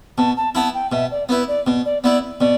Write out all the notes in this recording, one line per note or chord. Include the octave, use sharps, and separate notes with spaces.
B2 A5
A5
B3 E4 A5
G5
B2 E5
D5
B3 E4 B4
D5
B2
D5
B3 E4 D5
B2 D5